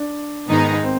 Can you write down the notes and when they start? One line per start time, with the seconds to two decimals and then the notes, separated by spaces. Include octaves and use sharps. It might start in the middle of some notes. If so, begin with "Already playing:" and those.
Already playing: D4
0.48 G#2 D#3 G#3 B3 D#4
0.83 C4